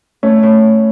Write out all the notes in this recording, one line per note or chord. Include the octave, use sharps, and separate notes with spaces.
A3 C#4
A2